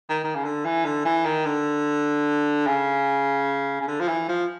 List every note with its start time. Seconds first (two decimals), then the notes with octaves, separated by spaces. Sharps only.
0.09 D#3
0.24 D#3
0.35 C#3
0.44 D3
0.65 E3
0.85 D3
1.05 E3
1.25 D#3
1.45 D3
2.67 C#3
3.81 C#3
3.88 D3
4.00 F3
4.08 E3
4.28 F3